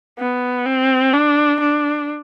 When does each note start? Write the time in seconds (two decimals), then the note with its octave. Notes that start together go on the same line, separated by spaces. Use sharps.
0.19 B3
0.66 C4
1.14 D4
1.60 D4